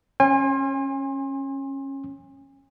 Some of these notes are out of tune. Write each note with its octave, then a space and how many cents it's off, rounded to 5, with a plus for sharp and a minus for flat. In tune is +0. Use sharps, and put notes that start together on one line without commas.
C#4 -20 G#5 -35 C6 +30